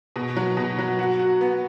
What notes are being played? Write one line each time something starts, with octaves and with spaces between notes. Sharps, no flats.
B2
F#3
B2
F#3
F#4
F#4
B3